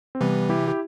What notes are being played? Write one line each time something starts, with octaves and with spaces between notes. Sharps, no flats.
C4
C3 E3 G3 B3
E4 G4
G4